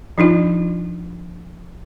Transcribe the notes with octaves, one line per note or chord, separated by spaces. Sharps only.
F3 D4 D#4 F4